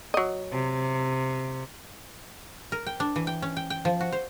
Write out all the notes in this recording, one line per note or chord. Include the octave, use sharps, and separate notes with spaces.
F#3 D#5
C3
A#4
G5
D4
E3
G5
C#4
G5
G5
F3
F#4
C5